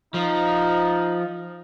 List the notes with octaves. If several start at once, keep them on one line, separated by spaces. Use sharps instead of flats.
F3 D#4